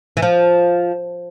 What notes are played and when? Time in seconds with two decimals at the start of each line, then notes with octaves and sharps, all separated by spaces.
0.17 E3
0.22 F3